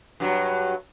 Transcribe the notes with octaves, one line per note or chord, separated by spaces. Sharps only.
G2 F#3